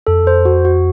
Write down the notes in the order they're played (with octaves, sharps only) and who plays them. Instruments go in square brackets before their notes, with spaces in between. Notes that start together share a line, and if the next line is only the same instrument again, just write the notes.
[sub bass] F2 [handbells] A4
[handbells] C5
F#4
F#4